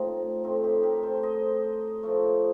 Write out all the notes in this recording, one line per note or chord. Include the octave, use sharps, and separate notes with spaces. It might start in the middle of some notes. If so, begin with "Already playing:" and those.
Already playing: A2 A3 C4 D#4 F4
A2 A3 C4 D#4
D#4 G4
G4 A#4
A4 C5
C5 D#5
A2 F3 A3